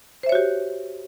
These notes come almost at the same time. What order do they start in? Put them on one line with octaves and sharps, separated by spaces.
C5 E5 C#5 F#4 G4